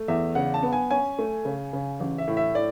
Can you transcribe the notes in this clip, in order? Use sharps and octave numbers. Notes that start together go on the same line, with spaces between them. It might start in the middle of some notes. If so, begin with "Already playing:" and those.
Already playing: A3
E2 E5
C#3 F#5
A5
B3
G#5
C#4 G#5
A3
C#3
C#3
A1
E5
A2
E5
A2 D5